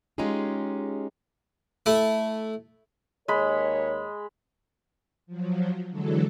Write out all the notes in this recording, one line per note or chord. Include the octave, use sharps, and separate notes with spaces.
G#3 C#4 D#4 F4 G4 G#4
A3 E4
D#2 G#3 A#4 C#5 B5
F3 F#3
D3 E3 F#3 G#3 A4